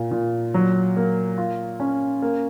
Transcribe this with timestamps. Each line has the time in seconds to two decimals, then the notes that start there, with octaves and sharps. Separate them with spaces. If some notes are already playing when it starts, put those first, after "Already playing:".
Already playing: A#2
0.11 A#2
0.54 F#3
0.97 A#3
1.38 F4
1.80 C#4
2.22 A#3